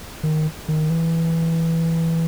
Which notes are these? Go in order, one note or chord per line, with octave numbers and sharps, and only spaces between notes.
D#3
D#3
E3